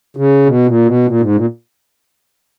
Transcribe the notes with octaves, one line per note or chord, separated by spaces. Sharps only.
C#3
B2
A#2
B2
A#2
G#2
A#2